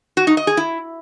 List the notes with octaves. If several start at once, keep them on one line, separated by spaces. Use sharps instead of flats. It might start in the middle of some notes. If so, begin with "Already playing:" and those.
F#4
D#4
D#5
G#4
E4